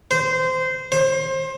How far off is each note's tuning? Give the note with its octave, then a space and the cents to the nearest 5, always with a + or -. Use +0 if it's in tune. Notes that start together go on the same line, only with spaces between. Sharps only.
C5 -20
C5 +25